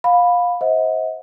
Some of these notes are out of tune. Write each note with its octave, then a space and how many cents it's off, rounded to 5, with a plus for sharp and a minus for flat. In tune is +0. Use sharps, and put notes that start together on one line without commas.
F5 +20 B5 +0
C5 +0 D#5 +45 F#5 -25